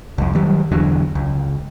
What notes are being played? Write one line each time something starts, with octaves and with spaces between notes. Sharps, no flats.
C2 F2
D#3 F#3 G3
E1 E2 D3 F#3
C#2